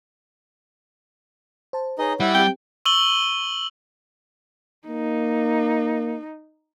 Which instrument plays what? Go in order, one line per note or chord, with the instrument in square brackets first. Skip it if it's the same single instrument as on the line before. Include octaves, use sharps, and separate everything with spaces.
[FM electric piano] C5 A5
[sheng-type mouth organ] D#4 G#4 D#5 [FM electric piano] B4 C#5
[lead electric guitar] G3 [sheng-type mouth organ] E4 F#5
[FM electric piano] C4 G4 [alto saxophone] G5
[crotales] C#6 E6 D#7 F#7 G7
[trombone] A#3 [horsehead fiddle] D#4